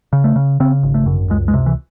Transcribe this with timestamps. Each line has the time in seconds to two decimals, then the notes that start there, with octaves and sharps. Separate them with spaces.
0.13 C#3
0.24 A3
0.36 C#3
0.60 C#3 C4
0.83 G#1
0.94 A3
1.06 F#2
1.30 C#2 G#3
1.48 G#3
1.54 C3
1.66 E3